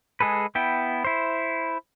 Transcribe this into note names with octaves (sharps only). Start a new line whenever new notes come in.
G#3 G#4 A4 B4
B3 E4 G5
E4 C5